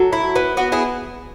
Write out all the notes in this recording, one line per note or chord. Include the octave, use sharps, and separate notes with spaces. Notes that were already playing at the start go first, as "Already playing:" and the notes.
Already playing: F#3 A4
E4
B3
B3 F#4
E4 G#4